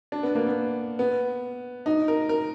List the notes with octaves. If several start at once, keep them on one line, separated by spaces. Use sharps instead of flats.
D4
B3
A#3
B3
B3
D#4
A#4
A#4